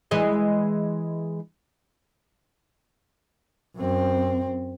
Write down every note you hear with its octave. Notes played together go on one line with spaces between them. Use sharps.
E3 G#3 D#5
F#2 C4